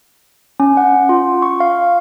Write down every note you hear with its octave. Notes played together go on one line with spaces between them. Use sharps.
C#4
F#5
F4
C#6
F5